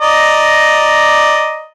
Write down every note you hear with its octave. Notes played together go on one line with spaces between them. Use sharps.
D5 D#5 A#5